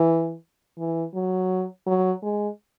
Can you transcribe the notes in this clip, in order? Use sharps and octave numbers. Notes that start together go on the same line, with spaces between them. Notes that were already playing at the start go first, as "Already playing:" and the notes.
Already playing: E3
E3
F#3
F#3
G#3